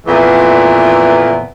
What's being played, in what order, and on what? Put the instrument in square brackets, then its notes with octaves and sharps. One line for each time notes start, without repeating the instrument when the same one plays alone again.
[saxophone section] F2 A#2 D3 E3 A3 B3